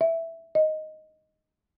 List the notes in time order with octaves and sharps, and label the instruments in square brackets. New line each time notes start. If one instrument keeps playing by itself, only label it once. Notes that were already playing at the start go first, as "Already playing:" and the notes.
[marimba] E5
D#5